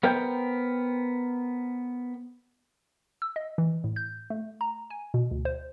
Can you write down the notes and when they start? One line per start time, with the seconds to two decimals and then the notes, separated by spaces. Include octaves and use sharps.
0.03 B3 A#4 C5 G5 G6
3.22 E6
3.36 D#5
3.58 E3
3.84 A2
3.96 G6
4.30 A3
4.61 A#5
4.90 G#5
5.14 B2
5.31 D2
5.45 C5